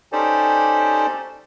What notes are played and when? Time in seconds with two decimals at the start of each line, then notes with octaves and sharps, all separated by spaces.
0.12 C#4 D#4 G4 A4 C5 D5